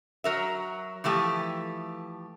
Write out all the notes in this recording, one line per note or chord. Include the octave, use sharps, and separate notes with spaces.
F#3 A#4 E5
E3 F3 A3 G4